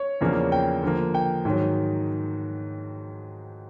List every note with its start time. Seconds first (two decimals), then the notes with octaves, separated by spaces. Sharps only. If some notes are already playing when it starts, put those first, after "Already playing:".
Already playing: C#5
0.21 E2 C#3 F3 A#3 D4
0.52 G5
0.83 D3 F3 A#3
1.14 G5
1.45 G#2 D#3 F#3